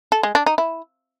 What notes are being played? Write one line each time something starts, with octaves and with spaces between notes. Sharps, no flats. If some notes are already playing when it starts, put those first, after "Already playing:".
A4
G#3
D4
D#4
E4